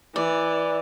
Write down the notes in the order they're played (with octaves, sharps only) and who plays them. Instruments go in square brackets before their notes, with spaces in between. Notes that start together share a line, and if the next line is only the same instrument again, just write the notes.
[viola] E3 [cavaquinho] D5